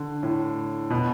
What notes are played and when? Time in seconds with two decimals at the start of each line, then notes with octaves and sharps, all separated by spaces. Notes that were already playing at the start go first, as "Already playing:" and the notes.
Already playing: D3
0.23 A2
0.90 B2